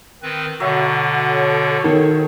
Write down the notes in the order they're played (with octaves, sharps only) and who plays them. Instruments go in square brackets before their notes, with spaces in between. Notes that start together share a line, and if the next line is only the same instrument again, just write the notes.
[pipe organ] D#3 C4 B4
[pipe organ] B2 D3 [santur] F#3 E5
[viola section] A4 C#5
[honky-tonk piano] D#3